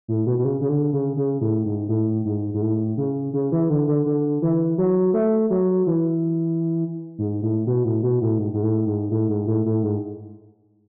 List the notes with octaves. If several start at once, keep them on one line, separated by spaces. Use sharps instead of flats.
A2
B2
B2
C#3
C#3
D3
C#3
C#3
A2
G#2
A2
G#2
G#2
A2
C#3
C#3
E3
D3
D3
D3
E3
F#3
A3
F#3
E3
G#2
A2
B2
A2
B2
A2
G#2
G#2
A2
G#2
A2
G#2
A2
A2
G#2